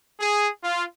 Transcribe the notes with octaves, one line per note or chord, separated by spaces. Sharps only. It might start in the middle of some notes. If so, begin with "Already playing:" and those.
G#4
F4